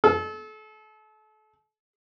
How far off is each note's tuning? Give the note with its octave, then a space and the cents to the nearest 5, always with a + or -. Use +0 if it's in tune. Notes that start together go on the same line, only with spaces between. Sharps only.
A4 -35